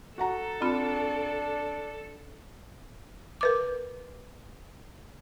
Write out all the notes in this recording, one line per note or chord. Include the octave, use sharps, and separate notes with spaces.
F#4 A4 F#5 A#5
C4 D4 F4 B5
A#4 B4 D6